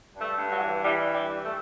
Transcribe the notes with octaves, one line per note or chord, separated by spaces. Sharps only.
G2
A3
G2
F#3
E3
E3 G3
G2
G3
E3
A3